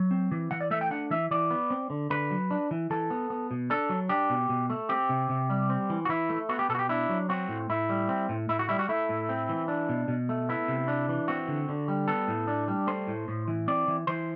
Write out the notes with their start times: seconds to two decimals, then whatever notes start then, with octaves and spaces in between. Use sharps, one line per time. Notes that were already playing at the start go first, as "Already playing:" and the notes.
Already playing: F#3
0.11 C4
0.31 E3
0.51 E3 F#5
0.61 D5
0.71 A3 E5
0.81 G5
0.91 D4 F#5
1.11 E3 E5
1.31 E3 D5
1.51 B3
1.71 C4
1.90 D3
2.10 D3 B4
2.31 F#3
2.51 D4
2.71 E3
2.90 E3 A4
3.10 B3
3.30 B3
3.51 B2
3.70 D4 A4
3.90 F#3
4.09 D4 G4
4.30 B2
4.49 B2
4.70 A3
4.89 C4 G4
5.09 C3
5.29 C3
5.50 G3
5.70 C4
5.90 E3
6.05 F#4
6.09 E3 E4
6.29 A3
6.49 B3 F#4
6.59 G4
6.69 B2 A4
6.75 F#4
6.79 G4
6.89 D4 E4
7.09 F#3
7.29 C4 F#4
7.49 A2
7.69 A2 E4
7.89 G3
8.09 C4
8.29 A2
8.49 A2 E4
8.59 F#4
8.69 G3 E4
8.79 F#4
8.89 A3 E4
9.09 A2
9.29 C4
9.49 E3
9.68 D4
9.89 B2
10.08 B2
10.29 A3
10.49 B3 E4
10.68 C3
10.88 D4
11.09 E3
11.28 C4 F#4
11.48 D3
11.69 D3
11.88 G3
12.08 B3 A4
12.28 A2
12.48 D4
12.68 G3
12.87 A3 C5
13.08 A2
13.28 A2
13.48 E3
13.68 C4 D5
13.88 E3
14.07 E3 C5